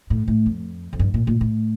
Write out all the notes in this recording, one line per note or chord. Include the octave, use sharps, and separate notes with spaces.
A2
A2
F2
F2
G2
A#2
A#2
A2